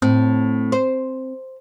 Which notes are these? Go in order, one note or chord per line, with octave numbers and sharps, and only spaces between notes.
A2 C4
C5